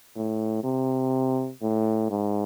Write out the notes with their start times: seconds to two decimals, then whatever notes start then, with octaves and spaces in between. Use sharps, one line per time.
0.16 A2
0.64 C3
1.62 A2
2.10 G#2